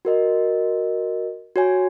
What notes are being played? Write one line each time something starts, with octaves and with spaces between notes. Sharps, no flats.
F#4 A#4 D#5
F#4 C#5 G#5